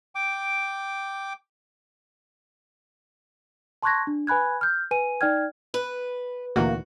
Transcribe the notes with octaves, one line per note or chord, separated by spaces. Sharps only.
G5 D6
A5 C6 C#6 F#6 G#6 A#6
D4
B4 G#5 B5 F#6 G#6
F6 G6
B4 G#5 D#7
D#4 D5 G5 F6 G#6
B4
D2 A#2 E3 A#3 F#4